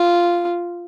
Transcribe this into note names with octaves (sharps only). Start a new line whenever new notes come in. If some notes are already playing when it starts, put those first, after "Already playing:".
Already playing: F4